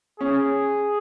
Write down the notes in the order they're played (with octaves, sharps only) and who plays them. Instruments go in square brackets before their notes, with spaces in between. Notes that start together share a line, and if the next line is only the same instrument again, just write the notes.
[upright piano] C#4 [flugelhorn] G#4